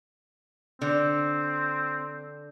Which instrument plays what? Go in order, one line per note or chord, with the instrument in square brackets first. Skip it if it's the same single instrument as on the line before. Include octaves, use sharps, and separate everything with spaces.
[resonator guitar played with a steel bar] D3 [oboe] C4